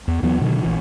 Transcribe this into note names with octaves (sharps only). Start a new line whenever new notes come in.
E2
D#2 E3 F#3 B3
B2 D3 D#3 F#3
A#1 E3